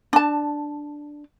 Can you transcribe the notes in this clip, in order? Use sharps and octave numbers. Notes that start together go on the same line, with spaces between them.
D4 A5